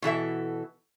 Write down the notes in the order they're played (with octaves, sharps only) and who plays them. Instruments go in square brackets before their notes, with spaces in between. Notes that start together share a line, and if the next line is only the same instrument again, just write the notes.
[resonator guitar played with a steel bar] B2 E3 A4 E5